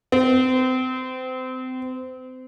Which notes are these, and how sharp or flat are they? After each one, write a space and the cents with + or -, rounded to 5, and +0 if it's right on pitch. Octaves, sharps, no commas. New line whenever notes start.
C4 -30